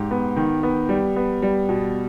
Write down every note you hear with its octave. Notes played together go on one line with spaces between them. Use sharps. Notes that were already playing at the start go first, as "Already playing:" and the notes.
Already playing: G#2 G4
B3
D#3
B3
G3
B3
G3
B2